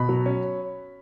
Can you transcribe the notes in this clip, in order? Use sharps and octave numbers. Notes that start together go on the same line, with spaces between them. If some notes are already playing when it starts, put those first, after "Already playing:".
Already playing: B2 B5
F#3
C#4